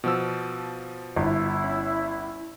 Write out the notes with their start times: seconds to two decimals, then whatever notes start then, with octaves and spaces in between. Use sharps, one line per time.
0.04 B2 F3 E6
1.16 G1 E4
1.64 C#4